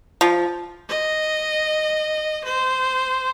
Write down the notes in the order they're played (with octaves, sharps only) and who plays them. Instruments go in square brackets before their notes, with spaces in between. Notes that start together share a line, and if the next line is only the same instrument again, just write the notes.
[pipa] F3
[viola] D#5
C5